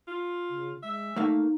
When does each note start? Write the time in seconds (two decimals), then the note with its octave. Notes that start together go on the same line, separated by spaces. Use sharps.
0.07 F4
0.50 C#3
0.83 G#3 E5
1.16 A3 A#3 D#4 F5